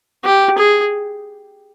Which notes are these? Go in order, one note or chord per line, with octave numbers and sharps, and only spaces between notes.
G4
G#4